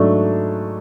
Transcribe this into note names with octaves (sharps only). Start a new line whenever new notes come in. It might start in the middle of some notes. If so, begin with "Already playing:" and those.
Already playing: G#2 F#3 A3 D4